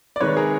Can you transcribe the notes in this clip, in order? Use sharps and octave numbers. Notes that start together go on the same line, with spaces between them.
D5
C3 D#3 G#3 B4 C#5
G#4 A#4